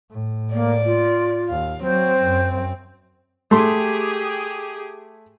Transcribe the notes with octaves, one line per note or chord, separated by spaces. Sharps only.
A2
A#3 D5
F4
D#2 F5
F#3 C4 C5
F#2
A3 G4 G#4 C6